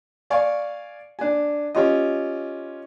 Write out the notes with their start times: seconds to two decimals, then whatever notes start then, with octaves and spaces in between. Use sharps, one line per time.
0.30 D5 F5 G#5 C#6
1.19 D4 G#5
1.75 C#4 F4 G4 D#5